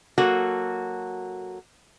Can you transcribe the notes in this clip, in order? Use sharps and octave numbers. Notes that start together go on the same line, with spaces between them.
F#3 A#3 F#4 A4